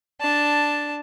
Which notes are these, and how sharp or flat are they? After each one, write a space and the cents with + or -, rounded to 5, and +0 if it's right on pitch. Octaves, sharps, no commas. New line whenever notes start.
D4 +0 A5 +0